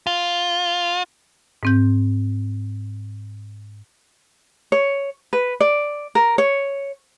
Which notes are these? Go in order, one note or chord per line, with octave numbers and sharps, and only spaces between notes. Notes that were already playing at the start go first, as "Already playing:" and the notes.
F4
G#2 C4 G6
C#5
B4
D5
A#4
C#5